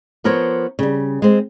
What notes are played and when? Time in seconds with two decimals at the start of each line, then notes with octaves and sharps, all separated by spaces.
0.24 F3 B3 A#4 C5 C#5
0.79 C#3 G3
1.22 G#3 C4